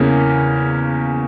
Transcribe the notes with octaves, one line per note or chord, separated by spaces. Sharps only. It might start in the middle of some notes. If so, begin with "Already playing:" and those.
Already playing: E2 C#3 A#3 C#4